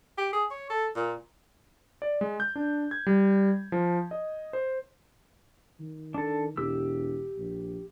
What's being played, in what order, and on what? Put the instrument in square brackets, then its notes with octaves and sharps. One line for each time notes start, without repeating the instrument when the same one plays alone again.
[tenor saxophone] G4
G#4
C#5
A4
A#2
[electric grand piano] D5
G#3
G6
D4
G#6
G3
F3
D#5
C5
[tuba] D#3
[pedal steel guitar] D4 A4
[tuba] E1 [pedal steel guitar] G4 E6
[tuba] A#1